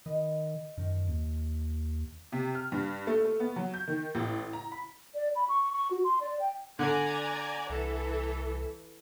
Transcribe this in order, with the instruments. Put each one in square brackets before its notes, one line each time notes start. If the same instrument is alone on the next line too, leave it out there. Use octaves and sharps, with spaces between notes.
[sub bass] D#3 [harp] B4 D#5
[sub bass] F#2 [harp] D#3
[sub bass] D#2
[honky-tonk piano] C3
F6
G2
A3
A3
B3
F#3
G6
D#3
A1
A#5
B5
[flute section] D5
B5
C#6
C#6
F#4
C6
D5
G5
[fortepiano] D3 [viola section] D5 G#5 A#5
[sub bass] C2 [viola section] E3 A4